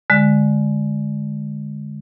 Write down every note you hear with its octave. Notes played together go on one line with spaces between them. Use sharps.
D3 G#3